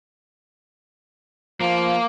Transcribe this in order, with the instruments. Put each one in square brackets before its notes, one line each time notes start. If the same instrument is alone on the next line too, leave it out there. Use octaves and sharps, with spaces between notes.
[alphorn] F3 [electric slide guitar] A#3